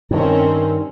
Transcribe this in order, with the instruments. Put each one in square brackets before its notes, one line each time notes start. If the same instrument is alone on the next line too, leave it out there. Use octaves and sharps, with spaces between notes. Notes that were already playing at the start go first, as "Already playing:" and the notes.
[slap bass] G2 D#3 [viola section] C4 C#4 A#4